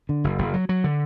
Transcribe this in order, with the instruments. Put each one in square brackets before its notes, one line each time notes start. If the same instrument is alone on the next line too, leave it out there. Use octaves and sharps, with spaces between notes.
[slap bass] D3
F#1
F#1
F#3
F#3
D3